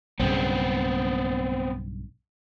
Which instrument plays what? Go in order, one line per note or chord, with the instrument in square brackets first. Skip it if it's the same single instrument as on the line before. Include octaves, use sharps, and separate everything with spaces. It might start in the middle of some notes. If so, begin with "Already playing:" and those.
[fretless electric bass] B1 G2 C#3 [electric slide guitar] B3 C4